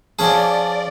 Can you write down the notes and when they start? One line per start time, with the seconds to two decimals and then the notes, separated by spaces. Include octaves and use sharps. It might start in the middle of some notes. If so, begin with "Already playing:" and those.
0.19 F3 C#4 G#4 D5 G#5 A5